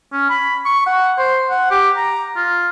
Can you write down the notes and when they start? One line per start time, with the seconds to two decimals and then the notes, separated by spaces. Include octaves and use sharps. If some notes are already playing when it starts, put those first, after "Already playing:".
0.13 C#4
0.29 B5
0.65 C#6
0.87 F#5
1.18 C5
1.50 F#5
1.71 G4
1.97 A#5
2.36 F4